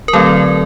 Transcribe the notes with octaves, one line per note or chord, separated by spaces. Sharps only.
A#4
D3 F#3 A3 C4 A4